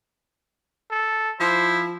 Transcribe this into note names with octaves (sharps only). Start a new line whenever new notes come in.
A4
F3 E4 C5